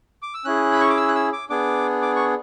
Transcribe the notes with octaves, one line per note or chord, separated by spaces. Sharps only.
D6
E6
C#4 E4 G#4 F#6
B5
C#6
D6
E6
F#6
E6
D6
B3 D4 G#4 D6
D6
C#6